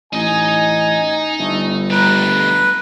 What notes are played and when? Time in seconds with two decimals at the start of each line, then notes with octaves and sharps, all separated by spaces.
0.13 A1 D#4 D#5 G#5
1.39 G1 A3
1.91 G3 A3 B4 A#5